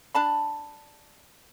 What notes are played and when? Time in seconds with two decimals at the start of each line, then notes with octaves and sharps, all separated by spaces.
0.15 D4 A5 B5